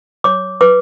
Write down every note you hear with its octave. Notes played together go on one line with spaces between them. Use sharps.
C#5 D6
B4 D6